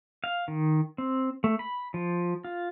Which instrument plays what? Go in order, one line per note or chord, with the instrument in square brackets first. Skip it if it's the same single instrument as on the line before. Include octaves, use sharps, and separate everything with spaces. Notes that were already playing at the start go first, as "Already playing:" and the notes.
[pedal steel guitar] F5
D#3
C4
A3
B5
F3
F4